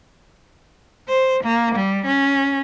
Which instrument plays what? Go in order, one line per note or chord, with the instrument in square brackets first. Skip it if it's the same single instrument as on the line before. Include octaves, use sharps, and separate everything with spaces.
[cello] C5
A#3
G3
C#4